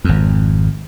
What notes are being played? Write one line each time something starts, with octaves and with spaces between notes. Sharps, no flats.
G#1 F2